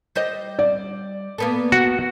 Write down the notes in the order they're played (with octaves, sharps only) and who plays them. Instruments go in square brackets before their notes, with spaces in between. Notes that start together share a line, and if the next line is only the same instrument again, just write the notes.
[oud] G3 C5 D#5
[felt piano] D5
[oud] A#3 B3 A4
[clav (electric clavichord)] F#4